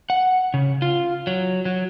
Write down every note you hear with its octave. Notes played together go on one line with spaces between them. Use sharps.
F#5
C#3
F4
F#3
F#3